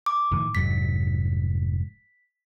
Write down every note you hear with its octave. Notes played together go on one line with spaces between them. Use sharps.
D6
A2 D#3 F3
F1 G#2 F#3 B6